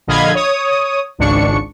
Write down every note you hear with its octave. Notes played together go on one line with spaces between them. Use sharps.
A#1 D3 D#5 F5 B5 G#6
C#5 D#6
G#1 C#2 G#2 D4 C#6 C#7